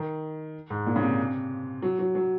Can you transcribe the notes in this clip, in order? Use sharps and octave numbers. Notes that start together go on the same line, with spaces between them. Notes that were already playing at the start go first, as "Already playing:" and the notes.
Already playing: D#3
G#2
A#2
C#3
C3
F#3
F#3
F#3